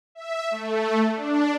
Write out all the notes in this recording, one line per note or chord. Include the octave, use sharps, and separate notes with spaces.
E5
A3
D4